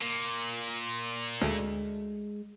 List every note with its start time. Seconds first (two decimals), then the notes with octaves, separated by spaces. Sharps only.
0.01 A#2
1.42 D2 G#3